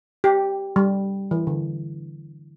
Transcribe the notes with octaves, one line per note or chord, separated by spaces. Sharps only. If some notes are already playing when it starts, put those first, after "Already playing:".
G4
G3
E3
D3